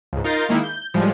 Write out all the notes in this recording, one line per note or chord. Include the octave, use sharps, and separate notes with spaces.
C#2 G#2
D#4 F4 A#4 G6 A6 C7
D#3 G#3 A#3 D#4 E4
G6
A2 F3 G3 G#3